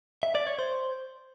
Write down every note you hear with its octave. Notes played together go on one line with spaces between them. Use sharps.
E5
D5
C#5
C5